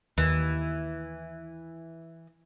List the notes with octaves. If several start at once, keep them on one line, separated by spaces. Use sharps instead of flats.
D#2 E3